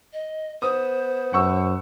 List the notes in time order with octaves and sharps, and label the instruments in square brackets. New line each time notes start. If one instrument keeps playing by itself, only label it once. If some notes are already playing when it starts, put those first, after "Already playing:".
[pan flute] D#5
[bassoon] B3 [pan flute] C5 [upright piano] D#6
[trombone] F#2 [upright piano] F#5 C#6 E6